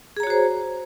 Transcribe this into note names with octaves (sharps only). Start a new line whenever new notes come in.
F#4 G#4 C5 C#5 A#5